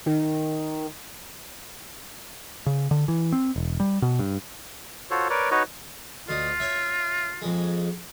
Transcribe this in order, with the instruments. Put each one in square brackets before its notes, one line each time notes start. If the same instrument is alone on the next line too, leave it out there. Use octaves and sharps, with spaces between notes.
[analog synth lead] D#3
[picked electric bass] C#3
D3
E3
C4
E1
G3
B2
G2
[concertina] F4 F#4 A4 C5 C#5
A#4 B4 C#5 D5
D#4 F#4 B4 C#5 D#5
[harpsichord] D2 D#4 [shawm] F4
[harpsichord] C#5 E5
F2 G#3